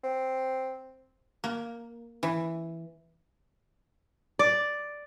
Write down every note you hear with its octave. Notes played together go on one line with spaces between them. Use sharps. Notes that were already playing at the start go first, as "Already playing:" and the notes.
C4
A#3
E3
D5